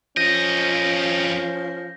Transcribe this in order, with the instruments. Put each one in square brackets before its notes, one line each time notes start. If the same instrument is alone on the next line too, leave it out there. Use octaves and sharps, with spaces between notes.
[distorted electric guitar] F2 D#5 [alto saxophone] F3 [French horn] C#4 [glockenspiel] G6 A#6